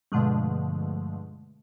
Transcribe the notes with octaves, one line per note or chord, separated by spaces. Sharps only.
G2 B2 D3 F3 G#3 A3